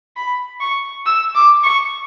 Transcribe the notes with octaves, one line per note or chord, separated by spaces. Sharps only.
B5
C#6
E6
D6
C#6